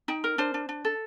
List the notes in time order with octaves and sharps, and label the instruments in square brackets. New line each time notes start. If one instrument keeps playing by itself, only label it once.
[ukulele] D#4 G5
A#4
D4 C5
D4
D4
A4